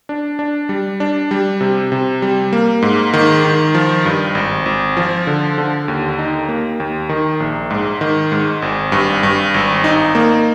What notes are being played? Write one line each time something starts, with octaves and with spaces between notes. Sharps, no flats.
D4
D4
G3
D4
G3
C3
C3
G3
A#3
G#2
D#3
D#3
F3
G2
G#1
G#1
F3
D3
D3
D#2
D#4
A#3
D#2
D#3
A#1
G#2
D#3
G#2
G#1
G2
G2
G#1
D#4
A#3